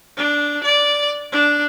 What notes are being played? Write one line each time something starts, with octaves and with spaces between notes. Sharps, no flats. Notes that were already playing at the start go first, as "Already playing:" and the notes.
D4
D5
D4